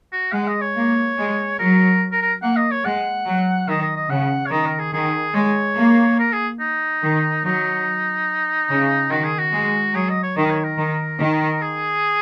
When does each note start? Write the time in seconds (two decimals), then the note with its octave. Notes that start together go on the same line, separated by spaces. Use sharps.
0.13 F#4
0.33 G#3 F#5
0.48 D#5
0.61 C#5
0.76 A#3
1.18 G#3
1.59 F#3 A#4
2.12 A#4
2.22 A#4
2.42 A#3 F#5
2.56 D#5
2.71 C#5
2.85 G#3 F#5
3.26 F#3
3.68 D#3 D#5
3.81 D#5
3.96 D#5
4.10 C#3 F#5
4.46 C#5
4.52 D#3 D#5
4.66 A#4
4.79 G#4
4.93 D#3 G#4
5.35 G#3 C#5
5.76 A#3
6.19 A#4
6.33 G#4
6.60 D#4
7.03 D#3
7.45 F#3 D#4
8.70 C#3
9.11 D#3 F#4
9.24 G#4
9.39 F#4
9.53 G#3
9.94 F#3 G#4
10.09 D#5
10.23 C#5
10.37 D#3 D#5
10.45 A#4
10.50 C#5
10.64 A#4
10.78 D#3
11.20 D#3
11.62 G#4